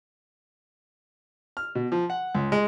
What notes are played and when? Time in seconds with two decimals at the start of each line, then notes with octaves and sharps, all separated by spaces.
1.57 F6
1.75 B2
1.92 F3
2.10 F#5
2.35 C#2
2.52 G#3